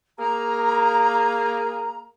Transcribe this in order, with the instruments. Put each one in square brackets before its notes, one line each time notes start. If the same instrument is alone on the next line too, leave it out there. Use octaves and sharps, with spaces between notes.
[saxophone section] A#3 G#4 [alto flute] A#5